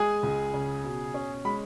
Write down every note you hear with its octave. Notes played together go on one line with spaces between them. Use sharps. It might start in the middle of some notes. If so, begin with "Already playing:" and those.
Already playing: G#3 G#4 G#5
C#2
C#3
B2
C#4
G#3 B5